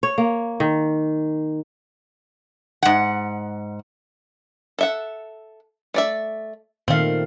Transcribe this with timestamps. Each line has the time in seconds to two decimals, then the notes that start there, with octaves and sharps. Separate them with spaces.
0.03 C#5
0.18 A#3
0.60 D#3
2.83 G#2 F#5
4.79 A4 E5 F#5
5.94 A3 D5 E5
6.88 A#2 D#3 A3 C4 F5